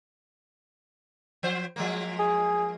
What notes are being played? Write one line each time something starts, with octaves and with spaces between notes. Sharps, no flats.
F3 C5
F3 G#3 A#3
G#4